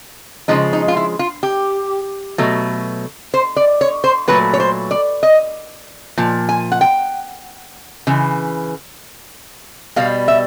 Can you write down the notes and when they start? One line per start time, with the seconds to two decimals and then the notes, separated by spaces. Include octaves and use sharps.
0.48 C#3 F3 G#3 D#4
0.73 D#4
0.88 F4
0.97 E4
1.19 F4
1.43 G4
2.38 B2 F#3 A3
3.34 C5
3.56 D5
3.81 C#5
4.04 C5
4.28 A#2 F#3 A3 B4
4.54 C#5
4.60 C5
4.91 D5
5.23 D#5
6.18 A#2 F3
6.49 G#5
6.72 F#5
6.81 G5
8.07 C#3 E3
9.96 B2 G3 F5
10.28 E5